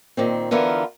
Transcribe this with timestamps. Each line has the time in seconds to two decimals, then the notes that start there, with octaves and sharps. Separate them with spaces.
0.17 A#2 D#3 C4
0.51 D3 E3 B3 F4 A#4